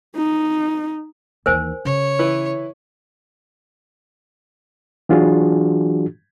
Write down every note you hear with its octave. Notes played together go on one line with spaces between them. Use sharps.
D#4
D#2 E3 A#4 C5 G#5
C#3 C#5
E3 E4 B4
E3 F#3 D4 F4 F#4 G#4